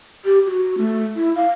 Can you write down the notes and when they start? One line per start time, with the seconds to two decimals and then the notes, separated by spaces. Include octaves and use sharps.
0.25 G4
0.46 F#4
0.78 A3
1.16 E4
1.36 F5